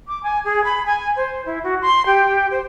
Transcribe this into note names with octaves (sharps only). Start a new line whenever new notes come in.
D6
G#5
G#4
B5
G#5
C5
E4
F#4
C6
G4
C5